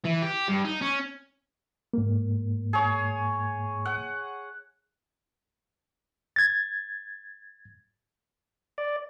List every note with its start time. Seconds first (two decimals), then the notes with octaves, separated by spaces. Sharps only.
0.04 E3
0.22 G4
0.48 G2
0.65 D#4
0.82 C#4
1.94 G#2 A#3
2.73 G#4 C#5
3.85 F#5
6.36 G#6 A6
8.78 D5